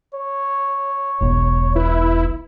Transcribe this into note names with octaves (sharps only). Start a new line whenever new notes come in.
C#5
E1 B1 B2
E4 B4